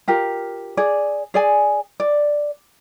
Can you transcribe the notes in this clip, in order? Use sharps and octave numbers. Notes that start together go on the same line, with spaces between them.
F4 G4 A#4
G#4 D5
G#4 D5 G#5
D5